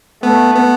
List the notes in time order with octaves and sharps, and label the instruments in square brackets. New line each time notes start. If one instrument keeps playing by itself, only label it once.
[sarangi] A3 [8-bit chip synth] B3
[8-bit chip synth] B3